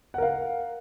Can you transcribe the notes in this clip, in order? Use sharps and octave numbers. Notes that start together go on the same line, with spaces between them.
A#4 F5 F#5